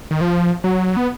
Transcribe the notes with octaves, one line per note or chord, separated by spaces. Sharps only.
D#3
F3
F#3
B3